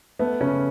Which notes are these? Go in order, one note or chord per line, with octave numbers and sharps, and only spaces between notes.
A3 B3
C#3 C#4